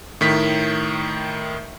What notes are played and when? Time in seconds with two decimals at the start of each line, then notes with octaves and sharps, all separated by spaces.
0.21 A2 D#3 B6